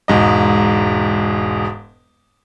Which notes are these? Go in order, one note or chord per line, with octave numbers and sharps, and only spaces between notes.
E1 G#2 D#5